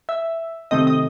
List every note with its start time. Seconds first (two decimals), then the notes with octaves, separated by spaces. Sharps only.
0.09 E5
0.71 C3 D#3 A3 C4 D#5
0.87 D#5